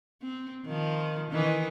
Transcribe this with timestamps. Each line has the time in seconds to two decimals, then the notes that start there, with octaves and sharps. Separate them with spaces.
0.22 C4
0.65 D#3 F3
1.31 D#3 E3 D#5